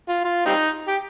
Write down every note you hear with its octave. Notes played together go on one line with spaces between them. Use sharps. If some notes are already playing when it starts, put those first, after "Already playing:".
F4
F4
G3 C4 D#4
G4